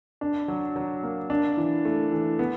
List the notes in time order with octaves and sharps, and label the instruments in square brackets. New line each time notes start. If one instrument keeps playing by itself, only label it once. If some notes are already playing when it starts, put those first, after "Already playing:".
[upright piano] D4
F#3
F#3
A#3
D4
E3
A3
E3
B3